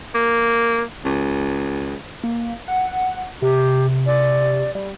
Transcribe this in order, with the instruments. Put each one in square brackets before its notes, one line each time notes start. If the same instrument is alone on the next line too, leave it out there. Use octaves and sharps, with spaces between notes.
[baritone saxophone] A#3
C#2
[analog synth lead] A#3
F#5
[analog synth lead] C3 [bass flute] G4
[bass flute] D5
[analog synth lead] G3